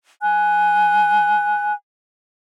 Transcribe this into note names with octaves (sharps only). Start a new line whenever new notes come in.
G#5 F#6